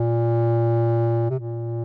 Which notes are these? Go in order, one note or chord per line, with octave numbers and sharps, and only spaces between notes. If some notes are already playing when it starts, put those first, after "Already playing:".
Already playing: A#2
C3
A#2